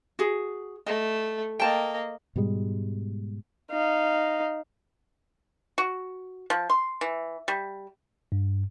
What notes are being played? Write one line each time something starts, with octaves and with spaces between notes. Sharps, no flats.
F#4 G#4
A3 D#5
A#3 D#5 G5 A5
G#2 B2 G3 G#3
D#4 F5
F#4
F3
C6
E3
G3
G2